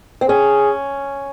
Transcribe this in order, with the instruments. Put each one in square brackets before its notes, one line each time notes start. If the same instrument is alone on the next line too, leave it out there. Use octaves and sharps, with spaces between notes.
[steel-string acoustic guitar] C4
[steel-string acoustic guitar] C#4 [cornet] G#4